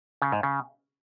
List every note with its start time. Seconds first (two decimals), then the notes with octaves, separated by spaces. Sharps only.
0.22 C#3
0.32 G#2
0.43 C#3